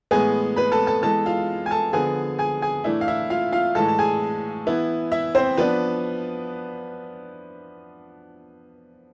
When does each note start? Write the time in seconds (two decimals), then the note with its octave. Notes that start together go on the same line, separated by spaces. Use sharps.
0.11 A2 E3 G#3 B3 G#4 G#5
0.56 B4 B5
0.72 A4 A5
0.87 A4 A5
1.03 E3 G#3 B3 A4 A5
1.26 F4 F5
1.66 G#5
1.71 A4 A5
1.93 D3 F3 B3 G#4 G#5
2.39 G#4 G#5
2.62 G#4 G#5
2.84 A2 E3 A3 D4 E4 E5
3.01 F5
3.08 E4 E5
3.30 F4 F5
3.52 F4 F5
3.75 A2 E3 G#3 A4 A5
3.88 A5
3.99 G#4 G#5
4.66 E3 B3 E4
5.12 E4 E5
5.35 C4 C5
5.57 F3 B3 D4 B4